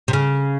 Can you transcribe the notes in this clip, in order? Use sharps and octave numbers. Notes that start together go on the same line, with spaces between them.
C3
C#3